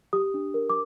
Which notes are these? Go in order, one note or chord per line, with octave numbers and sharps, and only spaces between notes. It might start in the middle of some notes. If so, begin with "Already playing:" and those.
G4 D#6
D4
A#4
D6